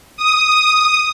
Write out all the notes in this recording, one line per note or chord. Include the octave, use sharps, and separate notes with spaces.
D#6